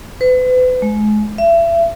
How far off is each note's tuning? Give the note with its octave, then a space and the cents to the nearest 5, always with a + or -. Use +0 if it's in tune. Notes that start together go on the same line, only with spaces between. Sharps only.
B4 +40
G#3 +30
E5 +35